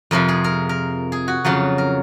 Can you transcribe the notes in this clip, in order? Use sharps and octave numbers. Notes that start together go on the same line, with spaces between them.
F2 C3 F3 A#4
G#4
A#4
A#4
G#4
F#4
F2 C#3 F#3 F4
A#4